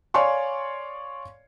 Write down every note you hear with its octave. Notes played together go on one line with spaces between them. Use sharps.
C#5 D5 F5 G#5 C6 C#6